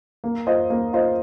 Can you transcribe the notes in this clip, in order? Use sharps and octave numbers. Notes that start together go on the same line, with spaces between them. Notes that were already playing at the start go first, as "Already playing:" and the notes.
A#3
F4 C5 D#5
A#3
F4 C5 D#5